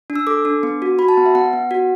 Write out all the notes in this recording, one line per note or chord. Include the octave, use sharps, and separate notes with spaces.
D4
E6
A4 D6
D4
B3
F#4
F#4 B5
A5
B3 F#5
E5
B3 F#5
B3
F#4